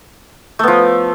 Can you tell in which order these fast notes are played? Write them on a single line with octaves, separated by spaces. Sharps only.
A3 B3 F3